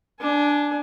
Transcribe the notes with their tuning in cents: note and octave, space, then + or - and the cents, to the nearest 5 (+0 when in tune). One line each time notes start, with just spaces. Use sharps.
D4 +0 G#5 +25